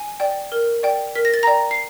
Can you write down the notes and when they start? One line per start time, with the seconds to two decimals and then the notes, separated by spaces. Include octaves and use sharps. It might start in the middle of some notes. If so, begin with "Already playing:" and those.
Already playing: G#5
0.20 D5 G5
0.52 A#4
0.83 D5 G5
1.15 A#4 B6
1.25 A#6
1.34 A6
1.43 D5 G5 A#5 A#6
1.71 C7